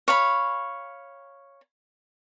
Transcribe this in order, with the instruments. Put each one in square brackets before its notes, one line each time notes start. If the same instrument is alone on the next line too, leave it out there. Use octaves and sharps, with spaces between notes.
[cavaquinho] C#5 F5 B5